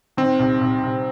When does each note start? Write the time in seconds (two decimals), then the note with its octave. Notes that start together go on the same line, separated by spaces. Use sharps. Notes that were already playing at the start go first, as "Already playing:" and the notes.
0.17 D#3 C4
0.39 C2
0.61 C2
0.83 C2